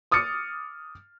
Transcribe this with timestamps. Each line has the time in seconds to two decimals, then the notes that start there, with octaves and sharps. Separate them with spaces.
0.11 D6 D#6 F6 A6 C#7